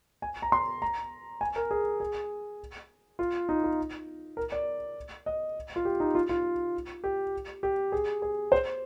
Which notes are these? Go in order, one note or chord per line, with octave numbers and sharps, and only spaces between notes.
G#5
A#5
C6
A#5
G#5
A#4
G#4
G#4
F4
D#4
F4
A#4
D5
D#5
F4
G4
D#4
F4
F4
G4
G4
G#4
G#4
C5